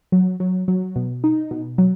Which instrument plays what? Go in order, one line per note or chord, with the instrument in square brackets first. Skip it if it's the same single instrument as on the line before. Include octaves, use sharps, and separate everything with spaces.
[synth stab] F#3
F#3
F#3
B2
D#4
B2
F#3